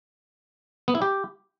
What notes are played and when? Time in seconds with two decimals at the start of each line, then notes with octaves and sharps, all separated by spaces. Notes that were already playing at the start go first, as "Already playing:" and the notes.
0.88 B3
0.95 E4
1.02 G4